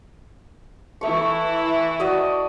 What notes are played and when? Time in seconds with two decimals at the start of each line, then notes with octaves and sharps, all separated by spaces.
1.01 E3 A3 E4 C#6
2.00 F#4 D5 D#5